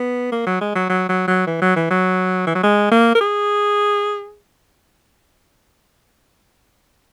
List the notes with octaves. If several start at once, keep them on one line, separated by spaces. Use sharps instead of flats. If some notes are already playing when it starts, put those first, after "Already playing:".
Already playing: B3
A#3
F#3
G#3
F#3
F#3
F#3
F#3
E3
F#3
E3
F#3
E3
F#3
G#3
A#3
A#4
G#4